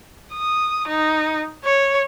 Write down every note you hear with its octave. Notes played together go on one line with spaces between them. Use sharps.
D#6
D#4
C#5